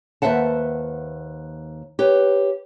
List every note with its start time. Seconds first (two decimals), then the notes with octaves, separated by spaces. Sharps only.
0.22 D#2 B4 C5 E5 F#5 A5
1.99 G4 B4 C#5